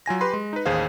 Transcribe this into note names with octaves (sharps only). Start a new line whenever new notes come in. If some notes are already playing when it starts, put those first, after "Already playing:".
F#3 F4 G#5 A#6
G4 B4 B5 C6
G#3
D#4 B4
A1 D#2 G#4 C5 F5